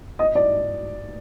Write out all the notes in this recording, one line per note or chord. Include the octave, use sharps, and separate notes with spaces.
D#5
D5